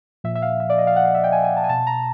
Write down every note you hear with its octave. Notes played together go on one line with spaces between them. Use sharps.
A#2 F3 E5
E5
F5
E5
D5
D#5
F5
F#5
F5
E5
G5
G#5
G#5
A5
G#5
B2 A5
A#5